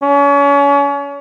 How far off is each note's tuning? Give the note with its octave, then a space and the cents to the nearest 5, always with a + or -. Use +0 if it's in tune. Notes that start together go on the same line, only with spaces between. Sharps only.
C#4 +35